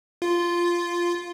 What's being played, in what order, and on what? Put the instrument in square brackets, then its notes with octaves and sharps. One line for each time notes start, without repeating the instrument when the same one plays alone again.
[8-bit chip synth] F4